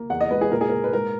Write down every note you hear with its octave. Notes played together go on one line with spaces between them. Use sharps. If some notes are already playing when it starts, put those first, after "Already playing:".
Already playing: A#3
E2 F#5
D#5
G#3 B4
G#4
A#2 A#4
G#4
A#3 A#4
B4
G#2 A#4